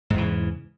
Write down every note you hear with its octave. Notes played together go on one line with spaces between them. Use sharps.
E2 G#2 C#3 E3